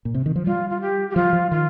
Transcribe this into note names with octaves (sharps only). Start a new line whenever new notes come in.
A#2
C3
D#3
F3
G3 F4
F4
G4
G4
F3 F4
F3
D#3 F4